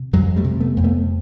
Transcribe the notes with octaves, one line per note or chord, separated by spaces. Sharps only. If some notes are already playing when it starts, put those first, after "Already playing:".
Already playing: C3
F2 F#3 G#3
G3 A3
C3
A3 B3
F2
A3 B3